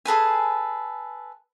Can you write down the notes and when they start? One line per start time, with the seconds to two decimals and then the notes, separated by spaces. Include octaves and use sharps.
0.05 G#4 A4 B4 G#5